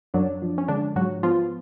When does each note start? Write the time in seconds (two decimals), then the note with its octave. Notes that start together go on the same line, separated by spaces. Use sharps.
0.14 F#2 F#3 D4
0.42 F3
0.58 C#4
0.68 D3 G#3 D4
0.96 G#2 F#3 F#4
1.23 F3 B3 F4